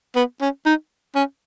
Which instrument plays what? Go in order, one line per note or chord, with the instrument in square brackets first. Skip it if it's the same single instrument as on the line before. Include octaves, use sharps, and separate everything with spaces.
[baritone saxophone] B3
C#4
D#4
C#4